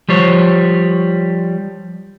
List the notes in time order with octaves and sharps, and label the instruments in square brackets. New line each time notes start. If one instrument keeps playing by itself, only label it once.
[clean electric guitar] F3 G3 C5 C#5